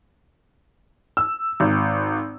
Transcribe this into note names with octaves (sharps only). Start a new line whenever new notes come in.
E6
G#1